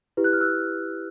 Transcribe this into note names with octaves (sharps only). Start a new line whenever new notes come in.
E4 G4 B4
F#6
F6
E6 F#6